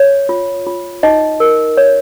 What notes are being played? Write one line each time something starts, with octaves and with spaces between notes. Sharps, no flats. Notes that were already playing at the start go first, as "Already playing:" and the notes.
Already playing: C#5
F4
F4
D#4 D#5
A#4
C#5